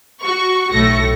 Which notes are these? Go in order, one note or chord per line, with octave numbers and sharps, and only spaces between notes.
F#4 C#6
B1 A2 A3 A#6 C#7